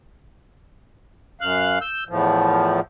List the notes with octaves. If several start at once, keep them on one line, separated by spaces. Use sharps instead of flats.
F#2 F5 F#6
E6 G6
E2 A2 F3